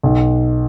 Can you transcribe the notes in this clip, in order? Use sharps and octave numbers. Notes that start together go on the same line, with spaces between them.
B1